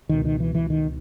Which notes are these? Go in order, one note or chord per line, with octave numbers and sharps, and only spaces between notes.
C#2 B2 D#3
D#3
E3
E3
D#3